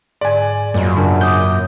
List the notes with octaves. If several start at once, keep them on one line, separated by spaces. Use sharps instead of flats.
G#2 D3 D5 G#5
F#2 A#2 A#3 D#5
C#3 D4 A#4
D6 D#6 G6